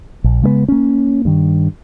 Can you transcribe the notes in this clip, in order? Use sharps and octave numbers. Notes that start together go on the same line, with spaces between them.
A#1
C#3 G#3 A3 B3
A#3 C#4
G2 D#3